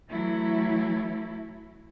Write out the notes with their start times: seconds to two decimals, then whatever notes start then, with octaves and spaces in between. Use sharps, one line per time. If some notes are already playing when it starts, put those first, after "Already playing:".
0.11 E3 F#3 A3 E4